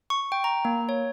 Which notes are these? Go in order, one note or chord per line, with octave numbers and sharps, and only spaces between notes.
C#6
G5
A#5
A#3
C#5